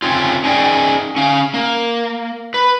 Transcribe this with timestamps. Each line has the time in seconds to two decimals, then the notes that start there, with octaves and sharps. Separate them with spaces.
0.02 C4 C#4 F4
0.44 C#4 D#4 G#4 D5 G5
1.16 C#4 F5
1.54 A#3
2.54 B4